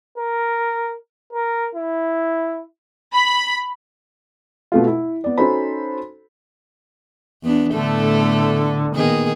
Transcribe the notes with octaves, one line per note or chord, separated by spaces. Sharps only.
A#4
A#4
E4
B5
B2 A3 F4
E4
B3 D5
C#4 D#4 F#4 A4 C5 B5
E2 B3 D4
A2 D3 A3 B3 A4
A#2 D#3 B3 G#4